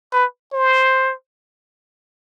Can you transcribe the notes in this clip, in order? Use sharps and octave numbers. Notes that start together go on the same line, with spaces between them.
B4
C5